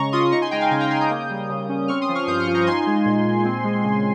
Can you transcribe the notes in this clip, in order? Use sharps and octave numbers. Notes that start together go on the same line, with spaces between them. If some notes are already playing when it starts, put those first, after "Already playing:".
Already playing: C#3 G#3 C#4 A#5 C#6
F4 C6 D#6
D#4 A#5 C#6
G#5 C6
G#3 G5 A#5
F5 G#5
C#3 F5 G#5
G5 A#5
C#3 G#5 C6
D#6 G6
A#3
G3
C#3
C#4
C4 C#6 F6
C6 D#6
F3
C#6 F6
G2 D#6 G6
C#6 F6
F4
A#5 C#6
D#4 G#5 C6
G#3
A#2
A#2
C4
G#3
C#3